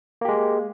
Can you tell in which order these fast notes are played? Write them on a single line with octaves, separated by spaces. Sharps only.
A#3 G4 G#3